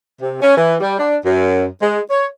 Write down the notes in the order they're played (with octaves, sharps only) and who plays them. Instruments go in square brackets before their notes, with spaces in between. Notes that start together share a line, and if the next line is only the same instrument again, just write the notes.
[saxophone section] C3
C#4
E3
G3
D4
F#2
G#3
C#5